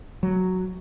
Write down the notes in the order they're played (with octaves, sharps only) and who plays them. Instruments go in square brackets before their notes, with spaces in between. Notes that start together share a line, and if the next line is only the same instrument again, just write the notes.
[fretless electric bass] F#3